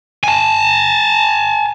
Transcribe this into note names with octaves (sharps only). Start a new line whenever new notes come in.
G#5 A5